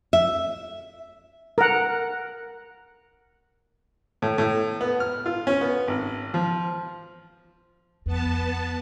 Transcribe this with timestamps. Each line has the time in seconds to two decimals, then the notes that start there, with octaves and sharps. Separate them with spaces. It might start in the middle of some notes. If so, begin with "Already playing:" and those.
0.13 E5
1.58 A#4 F#5
4.22 A2
4.38 A2
4.81 B3
5.00 F6
5.26 F4
5.47 C#4
5.61 B3
5.88 G#1
6.34 F3
8.06 F2 B3 A5